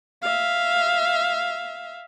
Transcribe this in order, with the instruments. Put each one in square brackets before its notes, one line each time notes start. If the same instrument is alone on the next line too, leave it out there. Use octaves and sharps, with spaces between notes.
[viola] E5 F5